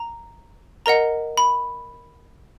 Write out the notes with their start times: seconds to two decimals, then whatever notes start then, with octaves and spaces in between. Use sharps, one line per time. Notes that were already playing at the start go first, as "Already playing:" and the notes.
Already playing: A#5
0.86 A#4 D#5 F#5 A#5
1.37 B5